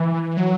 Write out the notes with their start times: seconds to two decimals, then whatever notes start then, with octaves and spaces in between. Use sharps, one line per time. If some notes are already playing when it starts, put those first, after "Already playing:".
Already playing: E3
0.37 F#3